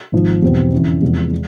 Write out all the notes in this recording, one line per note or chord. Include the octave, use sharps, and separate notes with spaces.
G#1 G#2 F3
E2 B2 G3 C4
F2 C#3 E3
E2 C3 F3 G#3
G#3